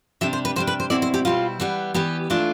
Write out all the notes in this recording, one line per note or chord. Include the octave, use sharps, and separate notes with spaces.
C3 G3 D4 E5
C5
B4
C3 G3 D4 C5
B4
C5
B2 G3 C4 E4 D5
C5
G4
B2 G3 C4 E4 F4
E3 G3 B3
E3 G3 B3 G4
E3 A3 D4 F4